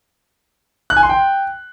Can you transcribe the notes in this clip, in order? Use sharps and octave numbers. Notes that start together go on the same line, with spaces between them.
F#6
G#5
C6
G5